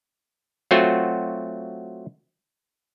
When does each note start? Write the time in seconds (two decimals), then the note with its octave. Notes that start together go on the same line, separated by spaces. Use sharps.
0.71 F#3 A3 C4 F4 F#4